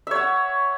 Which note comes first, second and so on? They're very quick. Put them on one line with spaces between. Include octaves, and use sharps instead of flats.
E5 C#5 F#5